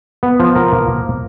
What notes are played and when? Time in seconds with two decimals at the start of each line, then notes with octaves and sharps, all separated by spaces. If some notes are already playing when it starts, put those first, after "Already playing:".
0.23 B3
0.40 F3
0.55 A#4
0.72 A#3